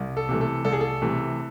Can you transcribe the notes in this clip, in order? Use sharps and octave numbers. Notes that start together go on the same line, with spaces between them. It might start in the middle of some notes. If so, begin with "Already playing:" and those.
Already playing: C2
A4
C3 E3 A3
A4
C2 A4
G#4
A4
C3 E3 A3